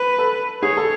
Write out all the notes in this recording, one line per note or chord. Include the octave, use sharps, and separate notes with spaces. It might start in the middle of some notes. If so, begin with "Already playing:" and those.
Already playing: B4
A4
G#4 C#5
A4